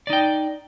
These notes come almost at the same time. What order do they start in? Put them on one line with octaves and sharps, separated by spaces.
D5 D#4 G5